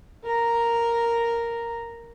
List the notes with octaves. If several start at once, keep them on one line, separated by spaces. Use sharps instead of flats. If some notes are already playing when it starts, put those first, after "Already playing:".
A#4 A#5